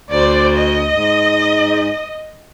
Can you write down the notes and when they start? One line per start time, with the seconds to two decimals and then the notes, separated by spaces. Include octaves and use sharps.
0.11 D2 C5 D5
0.57 D#5
0.95 G#2